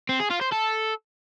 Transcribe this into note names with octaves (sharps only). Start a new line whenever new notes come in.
C4
G#4
F4
C5
A4